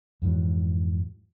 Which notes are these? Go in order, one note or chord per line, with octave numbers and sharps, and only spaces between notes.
F2 G#2 E3 F#3